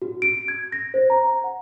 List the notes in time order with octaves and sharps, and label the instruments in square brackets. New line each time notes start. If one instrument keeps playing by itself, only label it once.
[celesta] F#4
D7
G#6
A#6
C5
A#5
F#5